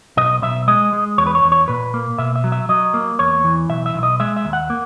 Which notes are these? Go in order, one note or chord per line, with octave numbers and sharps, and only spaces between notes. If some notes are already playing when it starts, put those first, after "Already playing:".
B1 D#5
B1 E5
G#3 D#5
G#3
E2 C#5
B4
C#5
E2
C#5
A#2 B4
A#3
B2 E5
E5
F#3
E5
F#3 D#5
A#3
E2 C#5
E3
B1 E5
E5
B1
D#5
G#3 E5
E5
D#2
F#5
A#3